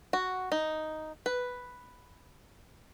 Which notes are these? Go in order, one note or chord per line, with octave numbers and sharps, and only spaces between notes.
F#4
D#4
B4